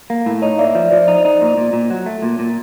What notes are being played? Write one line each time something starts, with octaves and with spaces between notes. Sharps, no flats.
A#3
A2
D#4 C#5 D#5
A#3 D5 E5
F3
F3 C5 D5
D#4
D#4
A#2
A#2
A#2
F#3
A3
A#2
A#2